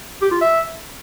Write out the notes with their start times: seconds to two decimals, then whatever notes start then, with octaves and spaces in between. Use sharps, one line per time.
0.22 G4
0.31 F4
0.41 E5